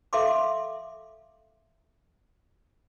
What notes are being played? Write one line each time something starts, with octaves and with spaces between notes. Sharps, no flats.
A4 E5 F5 C6 D6